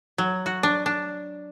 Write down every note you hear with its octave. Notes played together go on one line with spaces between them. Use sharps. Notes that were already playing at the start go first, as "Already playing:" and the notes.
F#3
F#4
D4
D4